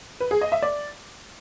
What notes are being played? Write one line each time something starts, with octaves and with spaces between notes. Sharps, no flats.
B4
G#4
D#5
E5
D5